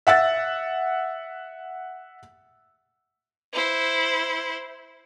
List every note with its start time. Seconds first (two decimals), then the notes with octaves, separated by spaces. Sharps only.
0.07 E5 F#5 E6 A6
3.53 E4 C5